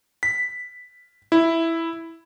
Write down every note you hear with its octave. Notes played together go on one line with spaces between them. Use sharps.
B6
E4